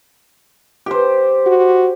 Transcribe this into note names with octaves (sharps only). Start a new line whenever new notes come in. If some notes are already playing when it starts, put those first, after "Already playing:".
G4 C5
F#4